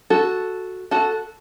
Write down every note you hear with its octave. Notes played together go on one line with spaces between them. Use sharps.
F#4 A4
F#4 A4